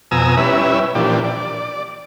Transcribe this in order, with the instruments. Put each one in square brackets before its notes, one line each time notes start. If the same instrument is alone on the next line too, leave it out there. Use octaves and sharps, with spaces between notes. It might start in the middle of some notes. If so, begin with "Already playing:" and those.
[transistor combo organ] F2 B2 G#5 A#5 D#6 E6
G3 C#4 E4 B4 E5
A#2 E3 F3 D4 G4
D5